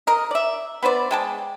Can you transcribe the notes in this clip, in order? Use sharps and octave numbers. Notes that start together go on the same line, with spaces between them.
A#4 D#5
D5 E5
B3 B4 C5 D5
G#3 G5 A5